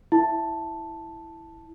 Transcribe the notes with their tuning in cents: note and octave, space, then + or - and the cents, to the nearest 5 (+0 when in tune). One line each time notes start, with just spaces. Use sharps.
E4 +0 A5 +0